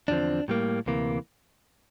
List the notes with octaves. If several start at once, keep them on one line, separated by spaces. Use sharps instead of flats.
E2 D3 F3 C4 D4
A2 G3 A#3
D2 C3 E3 A#3